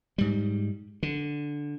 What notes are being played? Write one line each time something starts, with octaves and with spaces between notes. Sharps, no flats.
G#2 G3
D3